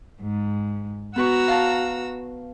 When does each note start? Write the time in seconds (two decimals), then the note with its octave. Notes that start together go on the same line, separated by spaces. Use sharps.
0.19 G#2
1.16 B3 F#4 B4 A#5 C#6 E6
1.48 F5 A5